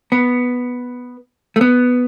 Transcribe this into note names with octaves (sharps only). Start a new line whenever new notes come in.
B3
A3
B3